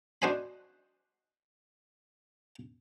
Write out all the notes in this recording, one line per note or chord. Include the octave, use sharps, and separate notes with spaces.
D4 F#4 C5 D#5 G#5 B5